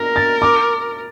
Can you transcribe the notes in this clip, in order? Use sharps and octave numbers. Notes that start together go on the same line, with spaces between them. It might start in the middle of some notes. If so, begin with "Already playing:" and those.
Already playing: A#4 A#6
A6
D6